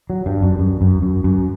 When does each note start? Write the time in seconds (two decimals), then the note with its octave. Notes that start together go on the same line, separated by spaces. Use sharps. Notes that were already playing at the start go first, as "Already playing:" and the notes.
0.10 F#3
0.26 G2
0.42 F#2
0.59 F#2
0.81 F#2
1.02 F#2
1.24 F#2